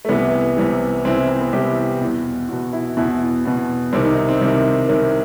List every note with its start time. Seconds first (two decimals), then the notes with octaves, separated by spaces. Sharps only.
0.05 A3
0.09 C2 C3 E3 B3
0.57 C2 C3 E3
1.05 C2 C3 E3 C4
1.29 C4
1.41 B3
1.53 C2 C3 E3 G4
2.01 E2 B2
2.49 E2 F#4
2.53 B2
2.73 E4
2.97 E2 B2 E4
3.45 E2 B2
3.93 C2 C3 D#3 C4
4.05 D#4
4.17 D#4
4.29 C4
4.41 C2 C3 D#3
4.89 C2 C3 D#3